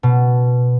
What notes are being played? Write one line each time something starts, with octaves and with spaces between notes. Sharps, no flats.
B2